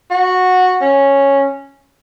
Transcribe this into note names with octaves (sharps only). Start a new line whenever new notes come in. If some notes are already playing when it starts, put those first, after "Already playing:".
F#4
C#4